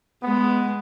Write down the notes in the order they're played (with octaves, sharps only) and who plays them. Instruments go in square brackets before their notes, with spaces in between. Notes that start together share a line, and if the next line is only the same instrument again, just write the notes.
[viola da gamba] G#3 [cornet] B3